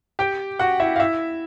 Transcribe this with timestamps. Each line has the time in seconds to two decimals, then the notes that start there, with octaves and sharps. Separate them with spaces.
0.19 G4 G5
0.59 F#4 F#5
0.80 E4 E5
0.96 F5
1.00 E4 E5